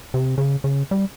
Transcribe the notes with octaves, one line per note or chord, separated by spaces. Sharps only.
C3
C#3
C#3
G3